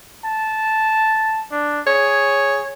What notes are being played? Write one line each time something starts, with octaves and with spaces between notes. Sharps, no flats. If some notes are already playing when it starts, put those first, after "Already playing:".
A5
D4
G#4 C#5